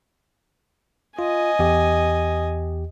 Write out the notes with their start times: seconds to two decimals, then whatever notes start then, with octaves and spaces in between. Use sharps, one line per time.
1.19 F4 D#5 G#5
1.59 E2 G4